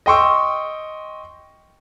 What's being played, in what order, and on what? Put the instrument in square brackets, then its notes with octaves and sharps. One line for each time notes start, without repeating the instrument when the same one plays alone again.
[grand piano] D#5 G5 C6 C#6 E6